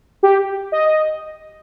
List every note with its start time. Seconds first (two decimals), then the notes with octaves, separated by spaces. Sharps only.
0.23 G4
0.72 D#5